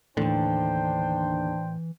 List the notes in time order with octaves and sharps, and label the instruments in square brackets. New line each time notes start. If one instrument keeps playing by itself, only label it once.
[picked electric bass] D#2 D3 [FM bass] A2 [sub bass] E3 [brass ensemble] D4 C5 G5